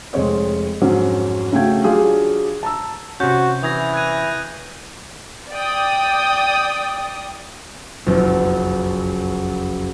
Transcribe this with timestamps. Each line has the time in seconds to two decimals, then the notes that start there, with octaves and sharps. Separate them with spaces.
0.13 F1 G#3 C4 C#5 D#5
0.81 F2 G#2 F#3 C#4
1.53 C#3 A3 F#4 G5 G#6
1.84 F#3 D4 F4 G4 G#4
2.63 A5 A#5 E6
3.20 C3 C#4 F#4 G6
3.63 E3 D#6 G#6 A#6
3.94 F#6 G#6 D#7
5.51 D5 G5 D#6
8.06 F#1 B1 F2